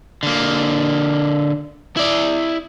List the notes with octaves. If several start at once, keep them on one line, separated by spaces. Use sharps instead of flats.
D3 A#3
E4 D5